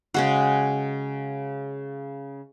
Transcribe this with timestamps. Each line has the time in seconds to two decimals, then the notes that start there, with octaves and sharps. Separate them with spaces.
0.14 C#3 G#3 F#4